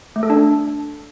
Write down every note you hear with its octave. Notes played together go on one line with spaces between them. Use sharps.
A3
A4
D4